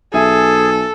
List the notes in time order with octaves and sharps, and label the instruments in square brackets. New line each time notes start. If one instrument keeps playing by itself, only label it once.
[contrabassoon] B1 [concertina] G#4 [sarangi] A4 [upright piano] E5 G#5